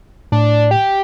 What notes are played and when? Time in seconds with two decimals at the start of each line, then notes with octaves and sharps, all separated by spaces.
0.32 A2 D4
0.71 G4